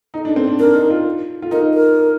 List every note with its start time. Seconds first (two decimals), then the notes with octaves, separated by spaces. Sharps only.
0.14 D#4
0.25 D4
0.36 C4
0.48 D4
0.60 D4 A#4
0.74 D#4
0.90 F4
1.42 F4
1.51 D#4 A#4
1.74 A#4